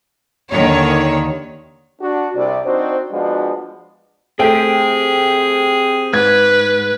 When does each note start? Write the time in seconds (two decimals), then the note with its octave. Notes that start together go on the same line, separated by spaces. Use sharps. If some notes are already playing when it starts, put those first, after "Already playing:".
0.51 D#2 D3 D#3 C#5
2.01 D4 F#4
2.36 C2 C3 D5
2.65 C4 D4 D#4 F#4 C5
3.12 F3 G#3 B3 D4 F#4
4.39 A3 C4 G4 G#4 G5
6.14 G#2 B4 G#6